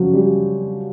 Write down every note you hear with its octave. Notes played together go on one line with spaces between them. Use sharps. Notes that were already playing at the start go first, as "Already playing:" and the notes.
Already playing: C#3 F3 F#3 C#4 F#4
G3 G4